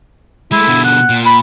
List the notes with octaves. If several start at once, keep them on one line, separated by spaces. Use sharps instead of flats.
G#3 A3 E4
B2 D3
F#5
A#2
B5